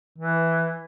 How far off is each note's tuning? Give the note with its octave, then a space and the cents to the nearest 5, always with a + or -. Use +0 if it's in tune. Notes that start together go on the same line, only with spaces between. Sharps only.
E3 +5